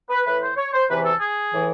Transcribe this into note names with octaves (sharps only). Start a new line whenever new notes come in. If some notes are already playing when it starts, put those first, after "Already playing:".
B4
A2 E3 B4
C5
C#5
C5
E2 C3 E3 B4
A4
G#4
A2 E3